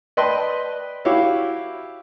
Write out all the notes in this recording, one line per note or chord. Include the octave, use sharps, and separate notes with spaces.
B4 D5 D#5 G5 A5 C6
E4 F#4 G4 C#5 F5